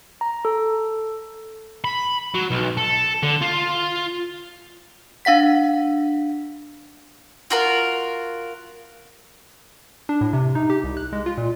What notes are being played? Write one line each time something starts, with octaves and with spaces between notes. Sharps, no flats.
A#5
A4
B5
F#3
B1
A4
D3
F4
D4 F5 F#5 B6
F4 F#4 A#4
D4
A2
C3
D#4
G4
C2
F#6
G#3
F4
A#2